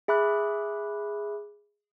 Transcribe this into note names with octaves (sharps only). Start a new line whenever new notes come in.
G#4 E5 B5 D6 F#6